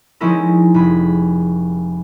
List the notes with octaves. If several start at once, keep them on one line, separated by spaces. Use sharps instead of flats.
F3 G#3 C#4 D#4 E4 A#4
F1 G#4 B5